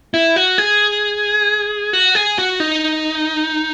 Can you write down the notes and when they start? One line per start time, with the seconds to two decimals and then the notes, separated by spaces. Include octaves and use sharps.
0.14 E4
0.36 F#4
0.58 G#4
1.93 F#4
2.15 G#4
2.38 F#4
2.60 D#4